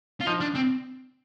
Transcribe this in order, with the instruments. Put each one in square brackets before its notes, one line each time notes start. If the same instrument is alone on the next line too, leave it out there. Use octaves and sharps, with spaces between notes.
[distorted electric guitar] F4
[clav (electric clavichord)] F3 [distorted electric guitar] D#4
[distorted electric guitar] D4
C4